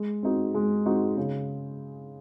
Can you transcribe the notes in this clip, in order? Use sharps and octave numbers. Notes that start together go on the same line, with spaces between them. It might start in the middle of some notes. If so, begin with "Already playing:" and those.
Already playing: G#3
C4 D#4 F#4
G#3
C4 D#4 F#4
C#3